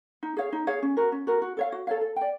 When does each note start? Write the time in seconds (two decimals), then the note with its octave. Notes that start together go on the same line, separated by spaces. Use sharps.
0.23 D#4
0.37 G#4 C#5 F5
0.53 D#4
0.67 G#4 C#5 F5
0.82 C#4
0.97 F#4 A#4
1.12 C#4
1.27 F#4 A#4
1.42 F#4
1.57 A4 C#5 F5
1.72 F#4
1.87 A4 C#5 F5
2.01 A4
2.16 D5 G5